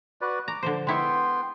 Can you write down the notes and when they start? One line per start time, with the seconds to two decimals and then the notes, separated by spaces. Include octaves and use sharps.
0.21 F#4 B4 D5
0.48 A#5 D6
0.63 D3 F3 C5
0.87 G#3 B3 E4 C#5 G5 C6